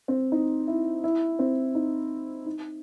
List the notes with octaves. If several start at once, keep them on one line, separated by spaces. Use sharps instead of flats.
C4
D#4
E4
E4
C4
D#4
D#4